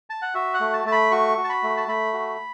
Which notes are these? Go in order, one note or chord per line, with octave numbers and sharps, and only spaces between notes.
A5
F#5
F#4 E5
F#5
A3
A5
A3 A5
B5
F#4 C#6
F#4
A5
B5
A3
A5
A3 B5
F#4